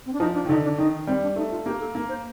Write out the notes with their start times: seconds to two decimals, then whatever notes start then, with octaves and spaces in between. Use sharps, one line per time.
0.06 C4
0.13 D4
0.20 F3 D#4
0.34 D4
0.45 D#3
0.49 D3 D#4
0.64 D4
0.78 D#3 D#4
1.07 G3 C4
1.22 D4
1.36 A3 D#4
1.51 F4
1.66 A#3 G4
1.80 A4
1.95 A#3
2.09 C5